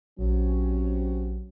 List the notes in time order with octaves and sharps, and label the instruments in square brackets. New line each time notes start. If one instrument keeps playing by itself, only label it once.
[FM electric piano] A#1 [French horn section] C3 C4 C#4 [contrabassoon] F#3